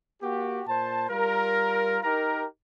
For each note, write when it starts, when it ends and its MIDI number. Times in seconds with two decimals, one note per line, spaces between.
0.22 0.61 58
0.22 0.61 66
0.22 0.61 67
0.67 1.05 46
0.67 1.05 72
0.67 1.05 81
1.10 1.98 55
1.10 1.98 65
1.10 1.98 70
2.04 2.45 63
2.04 2.45 67
2.04 2.45 70